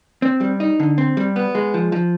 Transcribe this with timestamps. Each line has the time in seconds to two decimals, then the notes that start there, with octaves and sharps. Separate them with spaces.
0.22 C4
0.41 G3
0.60 D#4
0.80 D3
0.98 C4
1.17 G3
1.36 B3
1.55 G#3
1.74 F3
1.92 F3